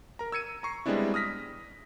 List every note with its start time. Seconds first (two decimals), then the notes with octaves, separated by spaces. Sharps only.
0.19 A#4 A#5
0.32 E6 G#6 C#7 D#7
0.63 A#5 C#6 C7
0.86 G3 G#3 B3 C4 D4 E4
1.14 D#6 F6 A#6 B6